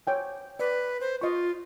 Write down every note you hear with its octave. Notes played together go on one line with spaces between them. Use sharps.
C#5 G5 G#5
B4 D5
C5
F4 D#5 C#6